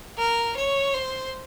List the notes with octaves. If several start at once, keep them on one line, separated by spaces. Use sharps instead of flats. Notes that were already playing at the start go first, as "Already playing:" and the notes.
A#4
C#5
C5